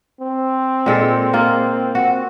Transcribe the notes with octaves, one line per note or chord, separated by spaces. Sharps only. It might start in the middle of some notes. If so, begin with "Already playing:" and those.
C4
A#2 G#3 A4
A#3 F4
F#4